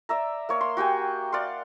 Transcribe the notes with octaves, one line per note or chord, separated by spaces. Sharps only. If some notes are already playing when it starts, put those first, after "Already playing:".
D5 E5 A#5
A#3 C#5
C6
F#4 G4 G5 G#5
D5 F5 F#5 C6